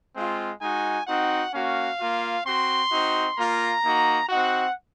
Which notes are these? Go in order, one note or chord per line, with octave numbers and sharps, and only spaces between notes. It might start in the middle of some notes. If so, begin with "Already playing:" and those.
G#3 C4 F4
G#3 D#4 F#4 G#5
C4 D#4 F#4 F#5
A#3 C#4 F#4 F5
A#3 F4
C4 F#4 C6
C4 D#4 F#4
A#3 F4 A#5
A#3 D#4 F#4
C4 D#4 F#4 F#5